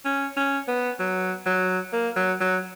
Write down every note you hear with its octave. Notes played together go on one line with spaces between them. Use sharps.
C#4
C#4
B3
F#3
F#3
A#3
F#3
F#3